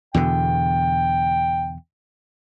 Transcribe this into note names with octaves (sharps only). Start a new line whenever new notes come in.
E2 B2 D3 G5